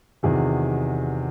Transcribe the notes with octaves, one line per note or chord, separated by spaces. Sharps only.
E2 C3 D#3 F#4 G#4